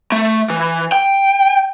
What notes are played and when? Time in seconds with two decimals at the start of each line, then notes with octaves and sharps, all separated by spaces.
0.12 A3
0.50 E3
0.92 G5